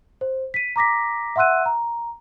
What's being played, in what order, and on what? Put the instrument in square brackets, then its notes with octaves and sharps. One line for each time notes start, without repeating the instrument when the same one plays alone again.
[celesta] C5
B6 D#7
A#5 D6 A#6 B6
E5 F#5 C6 E6 F#6 D#7
A#5